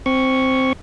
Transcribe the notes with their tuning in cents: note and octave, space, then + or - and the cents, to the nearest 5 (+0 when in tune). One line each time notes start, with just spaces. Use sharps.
C4 +0 C#6 +0